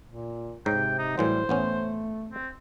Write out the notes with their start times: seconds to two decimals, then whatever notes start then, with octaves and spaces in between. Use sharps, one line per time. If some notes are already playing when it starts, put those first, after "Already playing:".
0.08 A#2
0.66 G#2 C3 C#5 G5 A#5
0.98 D#4
1.18 A2 E3 F#3 G3 C5
1.49 A1 A3 B3 C#4
2.32 C4